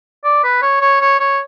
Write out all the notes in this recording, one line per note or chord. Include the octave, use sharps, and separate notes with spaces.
D5
B4
C#5
C#5
C#5
C#5